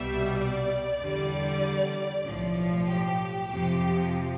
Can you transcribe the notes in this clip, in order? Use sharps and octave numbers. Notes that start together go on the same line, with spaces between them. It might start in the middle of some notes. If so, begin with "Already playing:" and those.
Already playing: C2 B2 G3 E5
D5
E2 D3 G3
B1 A2 F3
G4
F2 C3 F3 G4